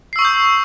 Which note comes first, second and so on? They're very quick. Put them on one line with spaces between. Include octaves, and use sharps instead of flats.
C7 E6 C#6 D#6 G6